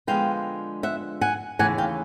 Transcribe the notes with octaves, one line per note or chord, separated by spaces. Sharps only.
D3 F3 G#3 B3 F5 G5
E5 F#5
F#5 G#5
D#2 C#3 E3 A3 F#5 G#5
F5 G5